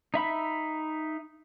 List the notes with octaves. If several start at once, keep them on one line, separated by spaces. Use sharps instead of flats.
D#4 E5 B5